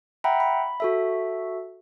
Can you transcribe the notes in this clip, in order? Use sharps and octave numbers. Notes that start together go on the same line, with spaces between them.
E5 F#5 G5 A#5 B5
B5
F#4 A4 E5